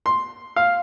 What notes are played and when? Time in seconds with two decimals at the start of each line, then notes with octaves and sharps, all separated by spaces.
0.06 C6
0.56 F5